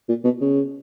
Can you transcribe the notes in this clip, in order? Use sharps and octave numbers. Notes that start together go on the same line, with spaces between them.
A#2
B2
C#3